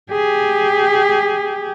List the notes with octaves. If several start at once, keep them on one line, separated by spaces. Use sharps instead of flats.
G4 G#4